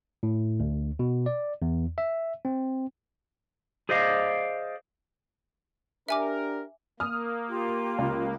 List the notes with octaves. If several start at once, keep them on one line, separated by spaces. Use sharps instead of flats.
A2
D2
B2
D5
E2
E5
C4
G#4 C5 D5 D#5 F5
D4 G4 A#4 E5 G#5 D6
A#3 D#6 F6
F4 G4
C#2